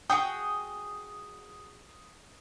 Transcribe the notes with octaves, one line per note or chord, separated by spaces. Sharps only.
F#4 G#4 G5 D#6